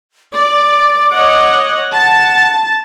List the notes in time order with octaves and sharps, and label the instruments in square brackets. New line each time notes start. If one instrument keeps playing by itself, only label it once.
[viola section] D5 [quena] D6
[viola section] C#5 D#5 F#5
[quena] F#5 [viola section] A5